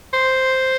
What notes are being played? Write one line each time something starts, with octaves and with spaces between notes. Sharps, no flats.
C5